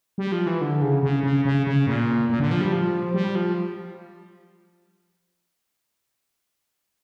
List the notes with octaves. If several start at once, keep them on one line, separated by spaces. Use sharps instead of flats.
G3
F3
E3
D3
C#3
C#3
C#3
C#3
C#3
A#2
A#2
D3
F3
G3
F3
G3
F3